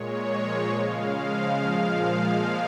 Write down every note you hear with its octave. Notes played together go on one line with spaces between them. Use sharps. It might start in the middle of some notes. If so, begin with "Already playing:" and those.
Already playing: A#2 G#3 C#5
A#2 F3 G#3
C#3 G#3 F5
C#3 F3 G#3
A#2 F3 G#3 F5
A#2 F3 G#3